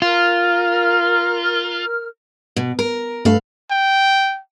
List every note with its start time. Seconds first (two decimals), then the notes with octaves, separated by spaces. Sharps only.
0.02 F4 A#4 F6
2.56 B2
2.79 A#4
3.25 G2 A3 A4 B4 F5
3.71 G5